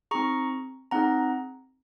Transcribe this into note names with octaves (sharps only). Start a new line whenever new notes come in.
C4 D#4 G#4 A#5 C#6
C4 D#4 G#4 F#5 A#5